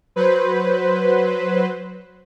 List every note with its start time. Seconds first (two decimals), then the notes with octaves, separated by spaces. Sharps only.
0.16 F#3 B4 C5